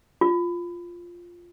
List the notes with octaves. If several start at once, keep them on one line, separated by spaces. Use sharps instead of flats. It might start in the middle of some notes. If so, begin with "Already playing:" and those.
F4